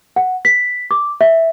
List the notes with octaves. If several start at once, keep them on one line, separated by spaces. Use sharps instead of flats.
F#5
B6
D6
E5